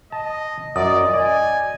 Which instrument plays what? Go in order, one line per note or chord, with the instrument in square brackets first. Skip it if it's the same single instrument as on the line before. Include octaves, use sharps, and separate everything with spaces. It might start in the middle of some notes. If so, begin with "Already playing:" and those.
[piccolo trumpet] D#5 [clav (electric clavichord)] A5
[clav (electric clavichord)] F#2 [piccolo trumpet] D5 [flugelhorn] D#5 [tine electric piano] D#6
[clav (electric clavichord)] D5 [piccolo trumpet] G#5